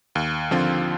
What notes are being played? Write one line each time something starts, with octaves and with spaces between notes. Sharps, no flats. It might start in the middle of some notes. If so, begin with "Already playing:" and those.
D#2
D3 F3 C4 F4